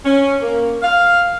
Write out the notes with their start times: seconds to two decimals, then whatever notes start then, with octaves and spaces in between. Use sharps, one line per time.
0.05 C#4
0.42 A#3
0.83 F5